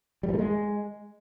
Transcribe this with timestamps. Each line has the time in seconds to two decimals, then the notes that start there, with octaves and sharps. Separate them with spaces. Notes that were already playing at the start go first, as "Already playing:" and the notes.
0.23 G3
0.29 E3
0.34 A3
0.39 G#3